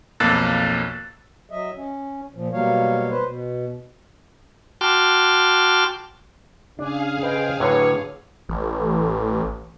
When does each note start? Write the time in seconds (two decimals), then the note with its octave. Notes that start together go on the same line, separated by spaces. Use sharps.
0.20 B1 F2 A#3 E6 F#6 A6
1.50 F#3 D#5 E5
1.77 C#4
2.35 A#2 F3
2.53 B2 F#3 G3 A#3 C#5 F5
3.11 B4 C5
3.26 B2
4.81 F#4 G5 A5 C6 D6 F6
6.79 C#3 D4 G#4 F5
7.23 B4 C5 D#5 G5
7.60 A2 D3 F#3 B4 C#5
8.49 A1